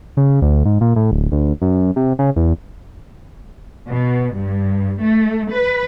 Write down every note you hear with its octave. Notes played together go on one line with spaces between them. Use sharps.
C#3
D2
G#2
A#2
A2
D1
D2
F#2
C3
C#3
E2
B2
G2
A3
B4